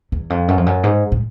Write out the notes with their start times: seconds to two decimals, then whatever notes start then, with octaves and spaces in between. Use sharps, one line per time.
0.12 E2
0.30 F2
0.48 F#2
0.57 F2
0.66 F#2
0.83 G#2
1.12 A2